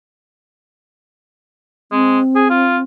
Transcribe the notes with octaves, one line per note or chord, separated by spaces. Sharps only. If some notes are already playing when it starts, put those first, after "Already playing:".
G#3 C4
G#4
F4